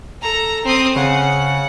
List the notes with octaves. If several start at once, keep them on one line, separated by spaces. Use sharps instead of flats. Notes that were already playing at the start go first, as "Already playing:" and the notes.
A4 A#5
C4 D#6
C#3 F#5